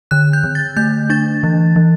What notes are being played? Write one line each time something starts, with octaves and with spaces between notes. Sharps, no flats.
D3 F#6
G6
D3
A6
A3 G6
D4 A6
E3
E3